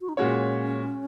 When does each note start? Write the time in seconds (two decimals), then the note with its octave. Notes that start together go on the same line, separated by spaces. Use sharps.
0.01 F#4
0.09 D#4
0.17 A#2 G#3 C#4 F#4 C#5